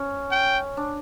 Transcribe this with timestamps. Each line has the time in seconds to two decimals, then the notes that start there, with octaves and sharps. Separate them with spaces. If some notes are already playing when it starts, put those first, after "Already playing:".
Already playing: C#4
0.31 G5
0.77 D4